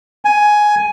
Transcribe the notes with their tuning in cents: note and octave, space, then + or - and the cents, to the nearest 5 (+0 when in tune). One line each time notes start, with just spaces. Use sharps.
G#5 +10